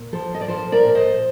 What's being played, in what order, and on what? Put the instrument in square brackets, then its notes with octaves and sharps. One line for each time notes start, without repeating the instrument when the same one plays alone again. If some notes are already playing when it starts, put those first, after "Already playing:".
Already playing: [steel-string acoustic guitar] A#2
F3 A4 C5
D#5
D5
F3 A4 C5
A#4 D5
A#2
C5 D#5